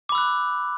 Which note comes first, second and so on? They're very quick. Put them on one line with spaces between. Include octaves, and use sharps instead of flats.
D6 B5 E6 F#6